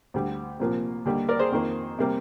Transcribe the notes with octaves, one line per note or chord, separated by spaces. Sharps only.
D2 D3 G3
C2 A#2 F3 A#3
D#2 D3 G3 A#3
A#4 D5
G#4 C5
F2 D#3 A#3
C3 G3 A#3